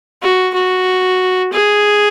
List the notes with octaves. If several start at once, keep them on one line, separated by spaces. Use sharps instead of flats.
F#4
F#4
G#4